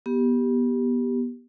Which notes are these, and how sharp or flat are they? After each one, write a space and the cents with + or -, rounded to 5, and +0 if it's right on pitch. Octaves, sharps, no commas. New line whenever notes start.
B3 -20 G4 +0